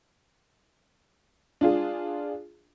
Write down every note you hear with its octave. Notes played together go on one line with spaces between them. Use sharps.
D4 F4 G#4